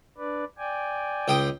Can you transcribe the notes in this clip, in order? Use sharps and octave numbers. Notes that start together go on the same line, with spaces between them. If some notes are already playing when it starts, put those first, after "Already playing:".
D4 B4 D5
D5 G5 G#5
C#2 G5 D#6